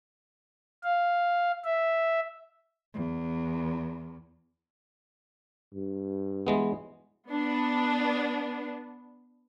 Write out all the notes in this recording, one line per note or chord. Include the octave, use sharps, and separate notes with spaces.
F5
E5
E2
G2
E3 G#3 B3
B3 D4